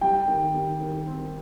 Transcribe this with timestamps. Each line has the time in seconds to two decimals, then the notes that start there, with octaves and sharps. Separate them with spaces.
0.01 G3 G5
0.28 D#3
0.54 D#3
0.81 D#3
1.07 C4